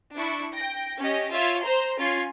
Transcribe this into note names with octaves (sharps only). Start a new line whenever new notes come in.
D4 E4 C#6
G5 A#6
C#4 G4 D#5
F4 C#5 E5
C5 A#5 C6
C#4 F4 G#5 C7